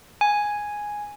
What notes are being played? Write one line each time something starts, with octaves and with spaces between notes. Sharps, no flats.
G#5